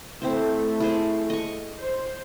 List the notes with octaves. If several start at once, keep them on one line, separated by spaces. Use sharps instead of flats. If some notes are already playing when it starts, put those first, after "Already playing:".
A3 C4 E4 C5
E4 G#4 C5
D#5 C#6
C5